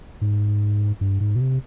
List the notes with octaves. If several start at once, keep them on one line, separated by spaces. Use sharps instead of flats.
G#2
G2
G#2
B2
C3